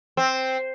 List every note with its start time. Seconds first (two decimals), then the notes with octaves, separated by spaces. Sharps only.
0.17 C4